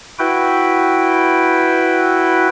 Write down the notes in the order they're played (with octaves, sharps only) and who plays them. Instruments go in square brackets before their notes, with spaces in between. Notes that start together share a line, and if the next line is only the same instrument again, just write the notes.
[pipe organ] E4 F#4 B4 G5